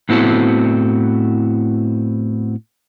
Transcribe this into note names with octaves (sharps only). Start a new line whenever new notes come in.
A2 B3 C4 E4 F#4 A4